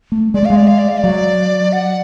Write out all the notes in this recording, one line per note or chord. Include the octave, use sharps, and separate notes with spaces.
A3
G#3 D5
A3
G#3 F5
D5
F5
D5
F5
F#3 D5
F#5